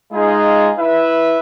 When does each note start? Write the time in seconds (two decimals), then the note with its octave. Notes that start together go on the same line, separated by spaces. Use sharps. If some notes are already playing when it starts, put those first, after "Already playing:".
0.12 G#3 D#4 F4 G#4
0.78 E4 B4 E5